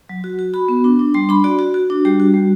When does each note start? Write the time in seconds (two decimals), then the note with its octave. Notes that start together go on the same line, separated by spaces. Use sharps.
0.09 F#3
0.24 F#4
0.39 F#4
0.54 F#4 B5
0.68 B3
0.84 D4
0.99 D4
1.14 G3 C6
1.29 D4 B5
1.44 F#4 D5
1.59 F#4
1.74 F#4
1.90 D4
2.05 G3 G4
2.20 F#4
2.34 G3